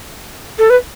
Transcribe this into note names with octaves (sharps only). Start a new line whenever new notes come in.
A4
B4